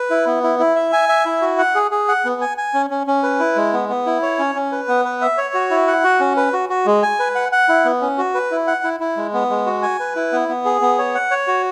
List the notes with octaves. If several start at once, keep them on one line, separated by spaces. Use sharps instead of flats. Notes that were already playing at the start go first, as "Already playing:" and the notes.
Already playing: B4
E4
B3
E4
E4
E5
G#5
E5
E4
F#4
F#5
G#4
G#4
F#5
B3
G#5
G#5
C#4
C#4
C#4
B4
E4
G#3
B3
B3
E4
C#5
C#4
C#4
B4
B3
B4
E5
C#5
F#4
E4
F#5
F#4
C#4
B4
F#4
F#4
G#3
G#5
B4
F#5
F#5
E4
B3
C#4
F#4
B4
E4
F#5
E4
E4
G#3
B3
G#3
F#4
G#5
B4
E4
B3
B3
G#4
B3
C#5
F#5
C#5
F#4